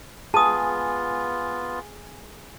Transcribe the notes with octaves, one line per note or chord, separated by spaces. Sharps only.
B3 F4 G#4 A5 D#6